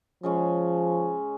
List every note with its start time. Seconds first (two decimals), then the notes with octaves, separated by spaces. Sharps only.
0.23 C#3 F3 G#3 C#4